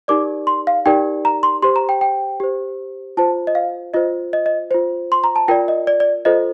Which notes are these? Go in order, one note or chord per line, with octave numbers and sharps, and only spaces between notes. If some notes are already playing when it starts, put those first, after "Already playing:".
D#4 G4 A#4 D5 D6
C6
F5
D#4 G4 A#4 D5 G5
A#5
C6
G4 C5 C6
A#5
G5
G5
G4 C5
F4 C5 A5
D#5
F5
F4 C5 D#5
D#5
D#5
F4 C5
C6
A#5
A5
F4 A#4 D5 G5
D#5
D5
D5
F4 A4 C5 D#5